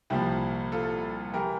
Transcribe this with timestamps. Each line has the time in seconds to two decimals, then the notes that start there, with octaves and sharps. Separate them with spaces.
0.10 C2 A#2 F3 E4 G4
0.72 F4 A4
1.33 E3 G4 A#4